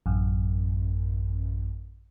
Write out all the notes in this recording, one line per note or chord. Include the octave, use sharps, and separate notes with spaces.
A1 F#2